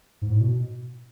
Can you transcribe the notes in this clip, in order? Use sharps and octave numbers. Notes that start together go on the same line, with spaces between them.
G#2
A2
B2